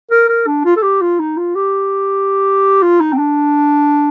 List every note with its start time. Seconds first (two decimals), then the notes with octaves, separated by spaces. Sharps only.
0.11 A#4
0.28 A#4
0.47 D4
0.65 F4
0.76 A4
0.83 G4
1.01 F4
1.19 D#4
1.37 F4
1.55 G4
2.82 F4
3.00 D#4
3.13 C4
3.18 D4